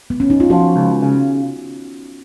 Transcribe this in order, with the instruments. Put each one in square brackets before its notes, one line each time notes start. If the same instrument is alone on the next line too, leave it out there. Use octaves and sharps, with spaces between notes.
[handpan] B3
C#4
D#4
F4
[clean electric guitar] F3 [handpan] F#4
[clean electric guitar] C#2
C#3